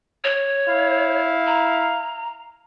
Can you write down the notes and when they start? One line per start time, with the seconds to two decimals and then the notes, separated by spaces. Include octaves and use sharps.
0.24 C#5
0.68 E4 F5
1.47 A#5